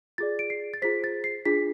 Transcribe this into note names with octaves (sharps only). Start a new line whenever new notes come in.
F4 G#4 D5 A6
D7
C7
A6
F4 G#4 C5 B6
A6
C7
D4 F4 G#4 B6